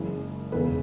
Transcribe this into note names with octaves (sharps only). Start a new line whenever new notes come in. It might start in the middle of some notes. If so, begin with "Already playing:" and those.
Already playing: F#1 F#2 C#3 E3 G#3
E1 E2 C#3 B4